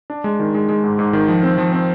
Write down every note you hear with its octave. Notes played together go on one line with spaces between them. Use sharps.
D4
G#3
D#3
G#3
G#3
G#2
G#2
D#3
F3
C4
F3
C4